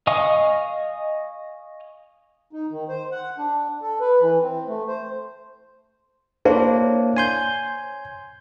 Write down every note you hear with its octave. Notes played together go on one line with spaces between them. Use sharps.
D#5 F5 G#5 C#6 D#6
D#4
D#3
C5
F#5
D4
A4
B4
E3
C4
A3
C5
A#3 D4 E4 C5 C#5
G#5 C6 G6